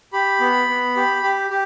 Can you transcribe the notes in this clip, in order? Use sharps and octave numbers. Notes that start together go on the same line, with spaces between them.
G4 B5
B3
B3
G4
G4
G4